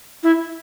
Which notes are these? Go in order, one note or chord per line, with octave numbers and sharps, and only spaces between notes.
E4